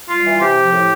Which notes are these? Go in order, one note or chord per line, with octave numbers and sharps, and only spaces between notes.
G3 F4
E3
C3 G4
F3
A2